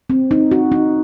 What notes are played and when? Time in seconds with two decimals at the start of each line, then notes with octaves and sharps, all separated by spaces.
0.10 C4
0.31 D#4
0.51 F#4
0.72 D#4